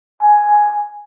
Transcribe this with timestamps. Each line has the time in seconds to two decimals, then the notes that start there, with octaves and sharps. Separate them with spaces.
0.23 G#5